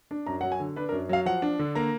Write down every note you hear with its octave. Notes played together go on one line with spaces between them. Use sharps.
D4
F#2 A#5
F#3 F#5
G#5
D3
D4 B4
A#4
F#2
F#3 F5
F3 F#5
D4
D3
A#3 A#5